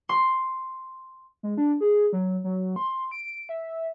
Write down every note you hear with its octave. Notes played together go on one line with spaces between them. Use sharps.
C6
G#3
D4
G#4
F#3
F#3
C6
D7
E5